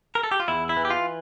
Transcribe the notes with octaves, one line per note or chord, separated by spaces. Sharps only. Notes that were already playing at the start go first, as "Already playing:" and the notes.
A#4
A4
G4
F4
E2 E4
E4
E3
G4
F4